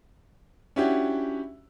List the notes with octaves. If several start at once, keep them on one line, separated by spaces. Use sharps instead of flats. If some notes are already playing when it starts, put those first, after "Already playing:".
C#4 D4 E4 F#4 G4